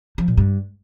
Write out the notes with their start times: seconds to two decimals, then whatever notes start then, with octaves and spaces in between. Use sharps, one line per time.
0.18 F3
0.28 A#2
0.37 G2